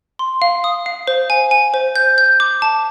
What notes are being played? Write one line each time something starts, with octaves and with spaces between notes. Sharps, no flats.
C6
F5
D#6
F5
C5
G#5
G#5
C5
G6
G6
D6
A5